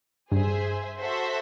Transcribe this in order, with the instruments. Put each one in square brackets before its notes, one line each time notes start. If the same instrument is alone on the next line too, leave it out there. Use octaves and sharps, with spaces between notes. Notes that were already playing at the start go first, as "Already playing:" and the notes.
[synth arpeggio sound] G2 [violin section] G#4 C5 E5
[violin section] F#4 A4 C5 E5